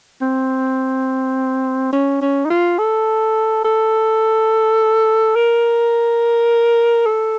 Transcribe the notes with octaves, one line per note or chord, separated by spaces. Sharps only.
C4
C#4
C#4
D#4
F4
A4
A4
A#4
A4